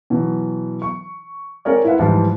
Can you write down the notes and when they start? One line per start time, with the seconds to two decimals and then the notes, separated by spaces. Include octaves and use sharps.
0.10 B2 E3 F#3
0.82 C#6
1.65 C4 G#4 A#4 C#5 D5
1.84 E4 F4 B4 E5 F#5
1.99 G#2 E3 F3 G3